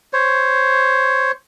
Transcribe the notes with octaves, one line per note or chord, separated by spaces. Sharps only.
C5 C#5